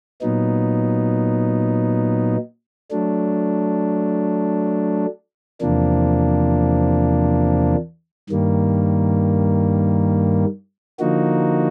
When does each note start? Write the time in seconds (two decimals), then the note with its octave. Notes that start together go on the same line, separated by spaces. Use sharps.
0.21 A#2 F#3 B3 D#4
2.91 F#3 A3 D4
5.61 E2 C3 F3 A#3 D4
8.30 G2 D#3 G3 A#3
10.99 D3 F3 A#3 D#4 F#4